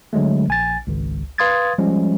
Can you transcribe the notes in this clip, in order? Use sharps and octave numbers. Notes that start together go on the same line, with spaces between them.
D3 F#3 G#3 A3
A#1 G#5 A6
G#1 C#2
B4 F5 C6 D#6 G#6 A6
F3 G3 G#3 C#4